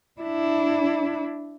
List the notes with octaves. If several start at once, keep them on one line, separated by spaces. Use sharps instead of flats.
D4 E4